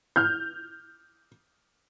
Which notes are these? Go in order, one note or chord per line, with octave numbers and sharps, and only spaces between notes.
F6 G6